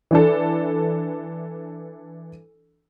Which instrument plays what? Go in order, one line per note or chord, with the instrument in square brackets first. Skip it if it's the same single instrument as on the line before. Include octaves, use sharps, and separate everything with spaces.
[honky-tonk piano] E3 D4 A4